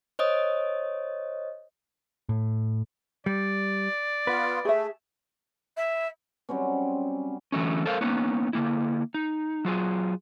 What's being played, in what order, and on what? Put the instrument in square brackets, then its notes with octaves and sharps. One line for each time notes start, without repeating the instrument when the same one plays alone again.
[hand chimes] C5 C#5 D#5 D#6
[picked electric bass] A2
[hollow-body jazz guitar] G3 [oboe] D5
[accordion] B3 F4 [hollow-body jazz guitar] B4
[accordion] A3 [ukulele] G#4 E5
[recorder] E5
[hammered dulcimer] F#3 G3 C4 C#4
[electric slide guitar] D3 E3 F#3 A3 C#4
A4 A#4 C5 F5
A#3 B3 C#4 D#4
D3 A#3 E4
D#4
F#3 F4 G#4